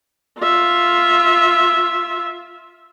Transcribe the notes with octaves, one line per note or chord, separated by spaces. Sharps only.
F4 E5